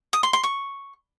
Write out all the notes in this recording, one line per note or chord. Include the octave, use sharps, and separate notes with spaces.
D#6
C6
C6
C#6